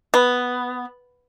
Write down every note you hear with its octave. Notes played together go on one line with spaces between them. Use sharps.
B3